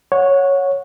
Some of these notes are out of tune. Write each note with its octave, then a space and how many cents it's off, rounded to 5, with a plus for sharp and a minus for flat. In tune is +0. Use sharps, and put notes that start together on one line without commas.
C#5 +0 F#5 -20